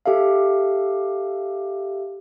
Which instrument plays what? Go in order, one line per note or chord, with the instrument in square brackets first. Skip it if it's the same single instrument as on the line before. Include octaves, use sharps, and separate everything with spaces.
[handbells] G4 A4 E5 F5